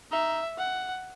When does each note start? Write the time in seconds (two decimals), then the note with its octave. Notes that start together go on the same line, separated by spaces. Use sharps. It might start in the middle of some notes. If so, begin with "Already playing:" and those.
0.11 D#4 E5
0.58 F#5